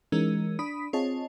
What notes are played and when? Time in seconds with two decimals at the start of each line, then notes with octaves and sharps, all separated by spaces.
0.12 E3 G#3 C#4 D#4 A#4
0.59 D4 B5 D#6 B6
0.93 C4 F4 G#4 C#5 D#5 A5